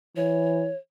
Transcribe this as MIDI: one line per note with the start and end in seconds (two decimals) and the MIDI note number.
0.16 0.71 52
0.16 0.76 73